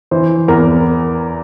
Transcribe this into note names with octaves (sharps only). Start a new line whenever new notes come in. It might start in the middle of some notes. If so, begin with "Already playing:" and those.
E3 C5
E2 A#4